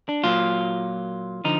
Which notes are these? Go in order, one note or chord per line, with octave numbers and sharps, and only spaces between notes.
D4
A#2 F#3 A#3 F4
D3 F3 D#4